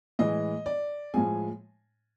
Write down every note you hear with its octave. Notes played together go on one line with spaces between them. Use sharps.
A2 E3 G#3 D#5
D5
A2 F3 G#3 G#5